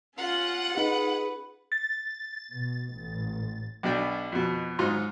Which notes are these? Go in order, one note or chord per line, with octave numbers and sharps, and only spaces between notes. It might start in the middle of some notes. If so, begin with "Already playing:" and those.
C#4 F4 F#5
D#4 G#4 B4
A6
B2
A1
B1 B2 D4 G5
F2 B2
G#2 F#3 D#4 F4 C6